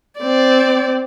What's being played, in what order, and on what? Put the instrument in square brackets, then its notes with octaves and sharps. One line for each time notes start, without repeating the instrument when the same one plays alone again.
[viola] C4 D5